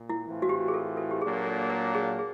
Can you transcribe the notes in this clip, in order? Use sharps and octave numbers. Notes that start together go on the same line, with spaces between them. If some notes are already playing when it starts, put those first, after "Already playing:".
Already playing: A#2
E4
A2 E3 A3 C4 F4
F#4
G4
G#4
A4
A4
G4
A#2 F#3 A#3 D4 G#4
A4
A#4
G#4
G#4